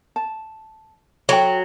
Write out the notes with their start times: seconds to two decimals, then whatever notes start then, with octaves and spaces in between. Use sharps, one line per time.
0.16 A5
1.29 F#3 A4 G5